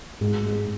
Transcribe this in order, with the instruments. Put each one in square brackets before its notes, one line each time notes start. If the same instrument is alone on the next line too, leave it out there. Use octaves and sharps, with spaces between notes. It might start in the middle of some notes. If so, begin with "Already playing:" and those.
[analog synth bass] G#2 [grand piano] G#3
[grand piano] G#3